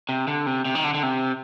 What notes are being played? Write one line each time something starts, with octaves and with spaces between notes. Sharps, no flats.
C3
D3
C3
C3
D#3
D3
D3
C3